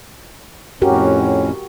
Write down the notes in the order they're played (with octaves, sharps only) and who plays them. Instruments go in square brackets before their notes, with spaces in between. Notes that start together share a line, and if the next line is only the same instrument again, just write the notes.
[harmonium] F2 A2 C#4 [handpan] F#4 G4 A#4